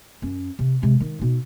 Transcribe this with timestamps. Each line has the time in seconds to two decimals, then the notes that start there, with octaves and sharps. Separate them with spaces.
0.22 F#2 C#4
0.59 C3
0.82 C3 G#3
1.00 D#3
1.19 B2 D#4